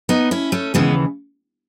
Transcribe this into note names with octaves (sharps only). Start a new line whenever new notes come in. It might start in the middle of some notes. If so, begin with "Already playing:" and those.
B3 D#4
C#4 E4
A3 C#4
D#2 C#3 E3 G#3 B3